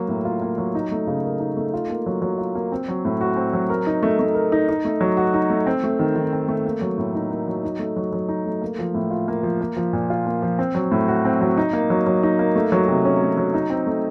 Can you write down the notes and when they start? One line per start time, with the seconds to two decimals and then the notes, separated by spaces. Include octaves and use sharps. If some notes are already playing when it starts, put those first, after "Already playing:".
Already playing: F#3 A#3
0.08 A2
0.25 F4
0.42 A#3
0.58 F#3
0.75 D#4
0.92 A3
1.07 C#3
1.24 A#4
1.40 D#4
1.57 A3
1.74 F4
1.90 A#3
2.06 F#3
2.22 F#3
2.38 F4
2.55 A#3
2.72 C4
2.88 F#3
3.05 A2
3.21 F#4
3.36 C4
3.53 F#3
3.70 A#4
3.87 D#4
4.03 A3
4.19 A3
4.35 A#4
4.52 D#4
4.69 D#4
4.85 A3
5.01 F#3
5.17 F#4
5.34 D#4
5.50 A3
5.66 C4
5.84 A3
5.99 D#3
6.16 D#3
6.33 C4
6.48 A3
6.66 A#3
6.81 F#3
6.98 A2
7.15 D#4
7.31 A#3
7.48 F#3
7.64 D#4
7.79 A3
7.96 F#3
8.13 F#3
8.29 D#4
8.46 A3
8.62 A#3
8.79 F3
8.95 A2
9.11 F4
9.28 A#3
9.43 F3
9.61 A#3
9.76 F3
9.93 A#2
10.10 F4
10.26 A#3
10.42 F3
10.59 C4
10.75 F#3
10.92 A2
11.08 F#4
11.25 C4
11.41 F#3
11.57 D#4
11.73 A#3
11.90 F#3
12.06 F#3
12.23 D#4
12.39 A#3
12.56 A3
12.72 F#3
12.88 C3
13.05 C#4
13.21 A3
13.37 F#3
13.54 D#4
13.70 C4
13.87 A3